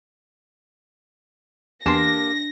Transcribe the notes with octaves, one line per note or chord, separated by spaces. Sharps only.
E2 A#3 D4 G4 A5 C6 A#6